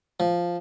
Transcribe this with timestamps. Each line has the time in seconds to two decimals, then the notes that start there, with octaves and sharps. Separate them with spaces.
0.20 F3